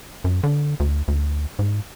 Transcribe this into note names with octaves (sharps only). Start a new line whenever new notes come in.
F#2
D3
D2
D2
G#2